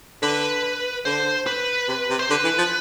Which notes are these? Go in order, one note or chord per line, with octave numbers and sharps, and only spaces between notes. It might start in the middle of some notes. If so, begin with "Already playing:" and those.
D3 B4
D3 C5
B4
C3
C3
C5
D3 B4
E3
F3